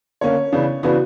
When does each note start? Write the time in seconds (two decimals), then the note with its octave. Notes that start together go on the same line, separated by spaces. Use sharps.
0.21 D3 A#3 C#4 C#5
0.52 C#3 E3 B3 D4
0.83 C#3 E3 B3 D4 F#4